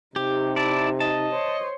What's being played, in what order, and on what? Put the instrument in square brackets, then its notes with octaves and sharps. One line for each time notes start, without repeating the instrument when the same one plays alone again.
[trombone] C3 [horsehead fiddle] D#4 [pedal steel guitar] G4
[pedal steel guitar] E4 D5 [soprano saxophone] A5
[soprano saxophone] D#5 [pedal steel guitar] A5
[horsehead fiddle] C5 C#5